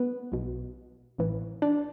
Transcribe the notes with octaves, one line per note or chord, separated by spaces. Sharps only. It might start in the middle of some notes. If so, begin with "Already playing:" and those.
Already playing: B3 B4
B1 B2
A1 A2 E3
D4 D5